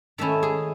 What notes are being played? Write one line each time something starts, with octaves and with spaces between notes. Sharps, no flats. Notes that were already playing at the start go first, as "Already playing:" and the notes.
D#3 A3 C#4 E4 E5
G#4